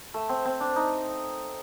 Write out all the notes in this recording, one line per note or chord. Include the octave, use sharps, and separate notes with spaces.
A3
C4
C4
D4
D#4